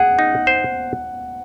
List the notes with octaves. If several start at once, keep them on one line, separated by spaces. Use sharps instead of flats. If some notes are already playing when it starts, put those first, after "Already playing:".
Already playing: G#4 F#5
D#4
C5